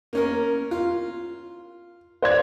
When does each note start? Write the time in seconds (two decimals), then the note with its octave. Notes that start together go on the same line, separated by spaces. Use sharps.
0.13 A#3 C#4 A#4
0.71 F4
2.22 C5 D5 G#6